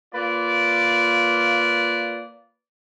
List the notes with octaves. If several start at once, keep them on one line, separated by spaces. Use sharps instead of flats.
A#3 F4 B4 D5